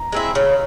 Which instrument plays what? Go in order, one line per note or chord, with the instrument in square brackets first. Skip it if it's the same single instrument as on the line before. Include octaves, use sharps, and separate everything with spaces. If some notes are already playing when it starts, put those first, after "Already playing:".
Already playing: [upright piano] A#5
[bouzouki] G#3 C4 E4
C#3